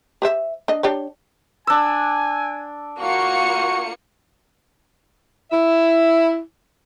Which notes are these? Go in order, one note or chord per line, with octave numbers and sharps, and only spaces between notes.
G4 C5 E5
D4 D#5
D4 G4 C#5
D4 G#5 E6
A#3 F4 F#4 C#6 C#7
E4 E5